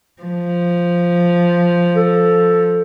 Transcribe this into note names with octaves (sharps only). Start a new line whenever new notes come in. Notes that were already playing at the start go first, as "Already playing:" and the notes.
F3
A4